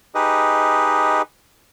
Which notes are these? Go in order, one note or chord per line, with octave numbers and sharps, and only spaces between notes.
D#4 G4 G#4 B4 D#5